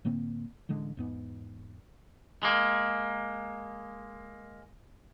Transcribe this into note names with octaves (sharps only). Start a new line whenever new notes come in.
A2 D3 A#3 C4
A1 D3 G#3
E2 G#2 B3
G#3 A#3